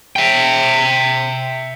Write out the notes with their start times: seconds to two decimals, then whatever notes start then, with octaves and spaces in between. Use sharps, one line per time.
0.16 E5 G5